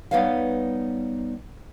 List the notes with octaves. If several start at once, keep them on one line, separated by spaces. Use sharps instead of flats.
G3 B3 D#4 B4 C#5 F5